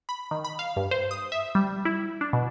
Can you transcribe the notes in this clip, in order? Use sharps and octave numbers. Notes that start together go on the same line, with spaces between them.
B5
D#3
B5
F5
G2
C5
D#6
E5
G3
E4
D4
B2